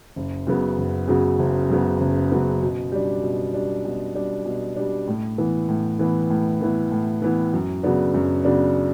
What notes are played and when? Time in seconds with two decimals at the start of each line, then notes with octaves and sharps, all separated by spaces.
0.16 F#1
0.47 F#2 C#3 F#3 B3
0.78 F#1
1.08 F#2 C#3 F#3 B3
1.39 F#1
1.70 F#2 C#3 F#3 B3
2.00 F#1
2.32 F#2 C#3 F#3 B3
2.62 B2
2.92 G3 D4
3.23 B2
3.54 G3 D4
3.85 B2
4.15 G3 D4
4.45 B2
4.76 G3 D4
5.08 A2
5.38 E3 B3 E4
5.69 A2
5.99 E3 B3 E4
6.30 A2
6.61 E3 B3 E4
6.92 A2
7.22 E3 B3 E4
7.53 F#2
7.83 C#3 F#3 B3 D4
8.14 F#2
8.45 C#3 F#3 B3 D4